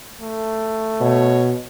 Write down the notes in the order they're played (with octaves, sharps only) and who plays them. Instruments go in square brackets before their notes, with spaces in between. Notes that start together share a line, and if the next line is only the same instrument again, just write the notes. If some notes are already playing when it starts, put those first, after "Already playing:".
[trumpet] A3
[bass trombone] B2 [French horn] C#5